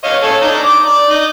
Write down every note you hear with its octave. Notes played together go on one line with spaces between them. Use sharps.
C#5 D#5 F5
A4 C#5 G#5
D4 D#4 A#5
D6
D5
D#4